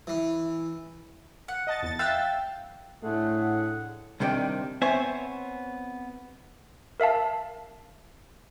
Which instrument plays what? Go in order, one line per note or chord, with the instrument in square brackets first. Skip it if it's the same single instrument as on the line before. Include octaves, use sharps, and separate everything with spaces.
[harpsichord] E3
[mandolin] F#5
[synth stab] D#5 A5 A6
E2 A6
[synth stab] E5 E6 A6 [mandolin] F5 G5 F#6
[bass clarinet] A2 [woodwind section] D3 G#4 F#5 [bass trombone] A3
[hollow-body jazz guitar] C2 C3 D#3 D4 G5
B3 C4 C5 C#5 E5 G#5
[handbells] A#4 E5 F5 A5